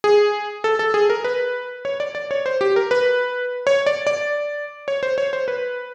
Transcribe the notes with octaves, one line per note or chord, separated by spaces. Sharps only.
G#4
A4
A4
G#4
A#4
B4
C#5
D5
D5
C#5
C5
G4
A#4
B4
C#5
D5
D5
C#5
C5
C#5
C5
B4